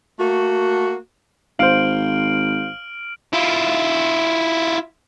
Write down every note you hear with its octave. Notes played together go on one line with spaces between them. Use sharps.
A3 A#3 F#4
G#1 C5 F5 F6 D7 F#7
E4 F4